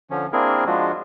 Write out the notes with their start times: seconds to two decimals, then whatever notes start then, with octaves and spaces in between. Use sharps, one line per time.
0.11 D3 F3 C#4
0.33 A#3 C4 D4 E4 G#4 A#4
0.67 F3 G#3 D4 F4 F#4